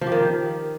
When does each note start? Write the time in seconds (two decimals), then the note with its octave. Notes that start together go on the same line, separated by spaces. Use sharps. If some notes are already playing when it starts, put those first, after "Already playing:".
0.01 F3
0.07 G4
0.12 D#3